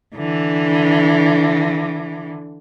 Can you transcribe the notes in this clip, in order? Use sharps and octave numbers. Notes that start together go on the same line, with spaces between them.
D3 E3